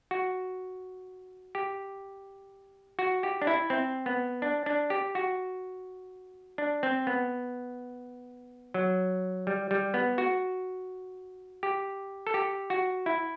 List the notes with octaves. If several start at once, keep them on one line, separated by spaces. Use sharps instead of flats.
F#4
G4
F#4
G4
D4
E4
C4
B3
D4
D4
G4
F#4
D4
C4
B3
F#3
G3
G3
B3
F#4
G4
A4
G4
F#4
E4